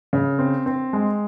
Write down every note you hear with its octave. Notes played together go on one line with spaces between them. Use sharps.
C#3
C4
C4
G#3